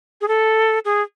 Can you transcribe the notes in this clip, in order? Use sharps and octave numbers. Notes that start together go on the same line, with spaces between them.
G#4
A4
G#4